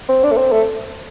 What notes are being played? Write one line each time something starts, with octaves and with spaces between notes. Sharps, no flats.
C4
D4
A3
C4
A3